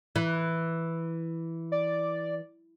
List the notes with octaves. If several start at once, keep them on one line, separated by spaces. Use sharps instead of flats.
E3
D5